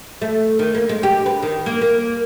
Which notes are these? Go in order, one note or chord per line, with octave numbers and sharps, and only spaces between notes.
A3
D#3
A#3
G#3
G4
B4
D#3
A#3
A#3